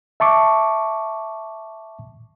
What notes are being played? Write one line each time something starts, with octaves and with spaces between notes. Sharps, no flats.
E5 A5 C#6 D6